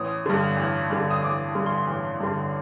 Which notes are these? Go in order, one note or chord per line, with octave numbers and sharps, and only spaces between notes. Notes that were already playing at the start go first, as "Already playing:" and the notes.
Already playing: A1 D#6
G2 D3
A1
G2 D3
D#6
A1 D6
G2 D3
C6
A1
G2 D3